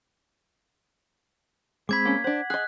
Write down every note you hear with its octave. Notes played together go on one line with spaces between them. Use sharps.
G#3 C4 B5 D6 G#6 B6
A#3 C#4
D4 C5 F#5
G#4 D#5 F#6